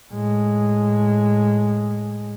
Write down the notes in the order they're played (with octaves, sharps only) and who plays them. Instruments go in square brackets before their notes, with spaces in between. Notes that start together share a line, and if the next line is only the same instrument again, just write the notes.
[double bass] A2 G#3